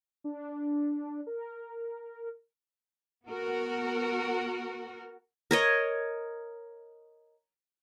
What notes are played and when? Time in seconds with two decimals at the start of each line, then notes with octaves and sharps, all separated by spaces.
0.24 D4
1.27 A#4
3.26 B3 F#4 A#4
5.51 A#4 C#5 D#5